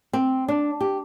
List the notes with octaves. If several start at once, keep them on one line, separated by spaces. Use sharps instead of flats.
C4
D4
G4